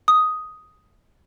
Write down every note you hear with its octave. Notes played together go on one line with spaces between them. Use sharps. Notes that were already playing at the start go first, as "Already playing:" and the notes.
D#6